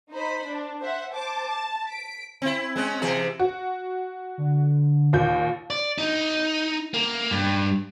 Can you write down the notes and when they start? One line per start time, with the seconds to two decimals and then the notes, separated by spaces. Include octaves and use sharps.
0.11 D#4 C5 B5
0.46 D4
0.80 C5 E5 F#5
1.14 C5 A5 D6
1.48 A5
1.88 B6 D7
2.42 C4 E4
2.76 G#3 C4 C#4
3.02 C3 E3 G#4
3.39 F#4
4.38 D3
5.13 D#2 A#2 G6
5.70 D5
5.98 D#4
6.94 A#3
7.31 G2